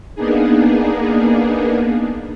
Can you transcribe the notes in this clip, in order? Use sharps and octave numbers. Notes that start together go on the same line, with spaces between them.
A#3 B3 D4 D#4 G#4